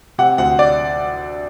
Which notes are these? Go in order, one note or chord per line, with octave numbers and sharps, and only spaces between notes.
C3 F#5
D2 F#5
D5